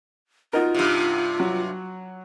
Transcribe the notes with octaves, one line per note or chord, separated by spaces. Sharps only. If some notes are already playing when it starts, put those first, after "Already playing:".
D#4 F4 F#4 A#4
G2 C3
F#3